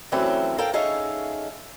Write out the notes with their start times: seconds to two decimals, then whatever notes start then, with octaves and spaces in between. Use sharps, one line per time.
0.12 E3 F#3 G3 A3 C4 C#4
0.58 A4 A#4 F5 G5
0.73 C#4 D#4 G#4 A4 E5 F5